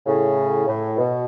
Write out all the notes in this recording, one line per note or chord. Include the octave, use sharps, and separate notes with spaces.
A2 C#3
A2
B2